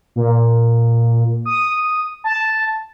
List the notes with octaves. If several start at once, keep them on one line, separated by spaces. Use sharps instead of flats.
A#2
D#6
A5